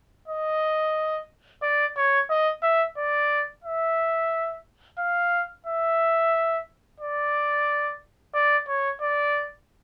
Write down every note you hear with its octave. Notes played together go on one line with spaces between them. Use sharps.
D#5
D5
C#5
D#5
E5
D5
E5
F5
E5
D5
D5
C#5
D5